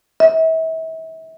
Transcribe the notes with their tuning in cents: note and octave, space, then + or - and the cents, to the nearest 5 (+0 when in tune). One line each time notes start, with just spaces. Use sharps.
E5 -35